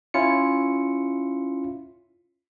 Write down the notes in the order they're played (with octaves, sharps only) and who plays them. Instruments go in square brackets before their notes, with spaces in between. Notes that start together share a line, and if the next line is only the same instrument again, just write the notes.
[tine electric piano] C#4 E4 F4 C#7